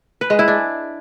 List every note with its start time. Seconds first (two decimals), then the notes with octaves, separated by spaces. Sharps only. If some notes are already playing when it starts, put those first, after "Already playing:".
0.21 B4
0.30 G#3
0.39 E4
0.48 D4